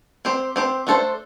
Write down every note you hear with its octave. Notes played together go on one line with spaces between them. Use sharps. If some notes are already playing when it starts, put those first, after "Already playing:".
C4 G4 C5
C4 G4 C5
A3 D4 A4 C5